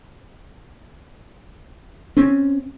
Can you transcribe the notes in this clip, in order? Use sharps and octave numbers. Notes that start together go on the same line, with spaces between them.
C4 C#4